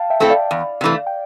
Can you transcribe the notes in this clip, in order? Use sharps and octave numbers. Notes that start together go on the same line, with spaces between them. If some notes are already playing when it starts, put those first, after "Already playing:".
Already playing: F5 G5 A5
E5 G5
A3 C4 E4 A4 G5
D5 F5
E2
C3 E3 A3
G5